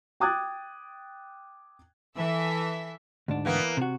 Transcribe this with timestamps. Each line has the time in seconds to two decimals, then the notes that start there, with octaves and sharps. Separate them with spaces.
0.20 G5 D6 D#6 F#6 G#6 A6
2.17 E3 A4 E5
3.28 D2 G#2 D4
3.45 E3 A#3 B3
3.77 C3 F#4